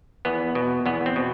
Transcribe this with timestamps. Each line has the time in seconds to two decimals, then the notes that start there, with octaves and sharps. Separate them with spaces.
0.25 E2 B3
0.55 B2
0.86 E2 B3
1.06 C4
1.16 B2